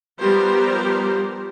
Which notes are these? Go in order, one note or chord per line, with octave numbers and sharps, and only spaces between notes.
F3 G3 B3 G4 A#4 C5